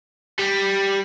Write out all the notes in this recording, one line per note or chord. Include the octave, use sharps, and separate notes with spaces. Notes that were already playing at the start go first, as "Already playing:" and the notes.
G3